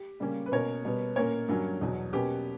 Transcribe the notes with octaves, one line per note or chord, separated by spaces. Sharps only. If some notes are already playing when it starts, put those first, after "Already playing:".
Already playing: G4
C#3 G3 A#3 C#4
B4
B2 A#3 C#4 A#4 C#5
B2 G3 B3
A#2 A#3 C#4 A#4 C#5
G2 F#3 A#3 C#4
E2 B2 F#3
B2 A#3 C#4 G4 B4